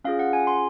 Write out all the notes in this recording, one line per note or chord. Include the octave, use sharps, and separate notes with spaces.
C#4 F4 G#4 F5
F#5
G#5
C6